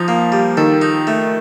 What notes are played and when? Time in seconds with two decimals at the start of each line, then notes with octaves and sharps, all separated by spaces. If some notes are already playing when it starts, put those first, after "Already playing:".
Already playing: F3 D#4
0.08 A#3
0.32 G3
0.57 D#3 A4
0.82 D#4
1.07 A3